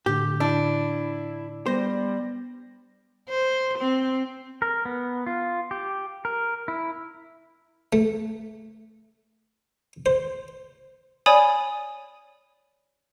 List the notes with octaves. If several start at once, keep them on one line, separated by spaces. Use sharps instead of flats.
A2 D3 G4
D4 E4
G3 B3 C5 A#6
C5
C4
A#4
B3
F4
G4
A#4
E4
A3
C5
C#5 D5 G#5 B5 D#6